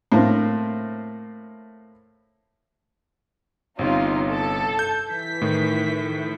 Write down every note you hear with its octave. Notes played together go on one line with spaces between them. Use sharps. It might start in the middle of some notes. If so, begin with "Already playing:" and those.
A2 A#3 C4
G1 C3 C#4 D#4 F4
A4
G6
E3 B6
A2 D#3